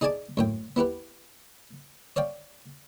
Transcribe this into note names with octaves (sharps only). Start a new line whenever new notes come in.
D#4 G#4 D5 G#5 A5 D6
F#2 A2 G5
B3 E4 G4 B4
C#5 D5 F5 G5